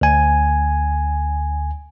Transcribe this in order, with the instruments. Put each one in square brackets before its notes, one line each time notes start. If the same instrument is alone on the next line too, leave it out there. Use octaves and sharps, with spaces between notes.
[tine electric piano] D2 G#5